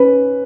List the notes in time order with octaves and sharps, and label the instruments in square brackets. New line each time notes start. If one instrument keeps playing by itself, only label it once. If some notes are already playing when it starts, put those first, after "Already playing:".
Already playing: [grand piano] C#4 B4